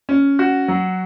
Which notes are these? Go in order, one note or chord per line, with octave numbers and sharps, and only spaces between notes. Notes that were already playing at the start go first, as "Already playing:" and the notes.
C#4
F#4
F#3